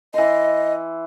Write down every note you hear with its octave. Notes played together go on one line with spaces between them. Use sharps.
E3 D#5 C6